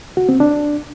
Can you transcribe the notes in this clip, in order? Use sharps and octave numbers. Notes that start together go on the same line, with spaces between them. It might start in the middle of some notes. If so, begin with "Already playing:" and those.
F#4
C4
D4